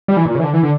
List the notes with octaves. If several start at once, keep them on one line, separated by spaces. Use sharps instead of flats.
G3
E3
A#2
C#3
E3
D3
E3
D3